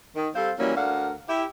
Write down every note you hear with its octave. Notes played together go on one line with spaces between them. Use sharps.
D#3
G3 C4 A4 C5 F5
E3 F#3 G3 A#3 C#4
D2 D4 A#4 F5 F#5
E4 G4